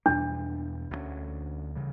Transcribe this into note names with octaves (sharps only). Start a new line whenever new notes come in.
E2 B2 G3 A#3 D4
D2 D3 F#3 C#4
C#3 E3 G3